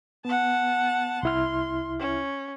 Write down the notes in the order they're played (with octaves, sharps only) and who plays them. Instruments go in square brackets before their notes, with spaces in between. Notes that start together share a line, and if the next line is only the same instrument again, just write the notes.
[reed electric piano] B3 [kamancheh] F#5 A5
[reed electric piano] C2 E4 F6 [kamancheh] C6
[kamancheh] C#4